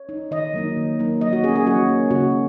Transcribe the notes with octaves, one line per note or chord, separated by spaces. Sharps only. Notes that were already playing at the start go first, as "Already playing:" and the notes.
Already playing: C#5
D#4
D#3 D#5
F#3 A#3 D#4
D#3
F#3 A#3 D#4
F#3 D#5
F#4
A#3 C#4 G#4
G#4
F#3 F#4
A#3 C#4
C#3 F#4